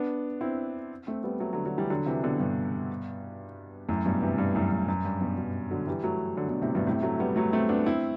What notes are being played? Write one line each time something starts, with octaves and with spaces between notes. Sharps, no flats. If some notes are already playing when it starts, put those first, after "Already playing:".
Already playing: B3 D4
C4 E4
A3 C4
G3 B3
F#3 A3
D3 F#3
D3 F#3
E3 G3
D3 F#3
C3 E3
B2 D3
G2 B2
F#2 A2
G2 B2
C3 E3
G2 B2
F#2 A2
G2
F#2
G2
G2 B2
G2 B2
D3 F#3
E3 G3
F#3 A3
D3 F#3
B2 D3
A2 C3
G2 B2
A2 C3
F#3 A3
G3 B3
F#3 A3
A3 C4
B3 D4
C4 E4